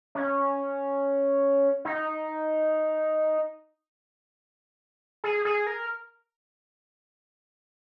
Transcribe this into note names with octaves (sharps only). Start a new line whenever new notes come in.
C#4
D#4
G#4
G#4
A#4